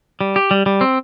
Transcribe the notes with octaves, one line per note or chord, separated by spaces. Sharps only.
G3
G4
G3
G3
C4